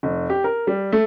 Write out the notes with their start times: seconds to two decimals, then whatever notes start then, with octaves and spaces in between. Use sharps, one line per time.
0.03 F1
0.30 G4
0.44 A#4
0.67 G3
0.92 A3